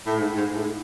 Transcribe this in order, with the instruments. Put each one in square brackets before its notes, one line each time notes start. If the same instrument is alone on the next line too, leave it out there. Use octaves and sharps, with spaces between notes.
[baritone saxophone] A2
G#2
G#2
G#2
A2